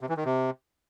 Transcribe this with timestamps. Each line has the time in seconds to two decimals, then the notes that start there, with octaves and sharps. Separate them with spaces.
0.01 C3
0.09 E3
0.17 D#3
0.25 C3